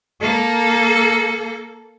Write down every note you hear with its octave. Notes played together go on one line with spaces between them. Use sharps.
A#3 A4